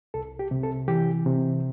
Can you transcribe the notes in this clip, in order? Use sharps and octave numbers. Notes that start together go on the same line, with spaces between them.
C2 A4
G4
C3
A4
E3 G4
C3